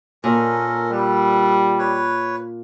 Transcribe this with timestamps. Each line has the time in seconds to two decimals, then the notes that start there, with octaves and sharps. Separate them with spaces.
0.24 A#2 C#4 A4 A#4
0.92 G3 A4 B4
1.79 B4 C#5